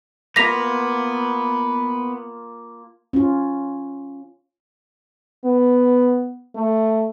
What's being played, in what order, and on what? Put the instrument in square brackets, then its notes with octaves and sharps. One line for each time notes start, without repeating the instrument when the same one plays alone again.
[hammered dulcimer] A#3 F4 A5 [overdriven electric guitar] B3 [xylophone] A#6 B6 F7
[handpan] C#4 F4
[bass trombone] B3
A3